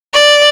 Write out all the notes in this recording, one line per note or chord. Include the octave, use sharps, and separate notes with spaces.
D5